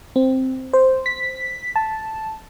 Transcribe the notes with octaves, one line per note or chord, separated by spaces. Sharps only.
C4
C5
B6
A5